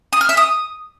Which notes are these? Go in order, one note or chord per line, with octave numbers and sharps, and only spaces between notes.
D#6
F6
E5
D#6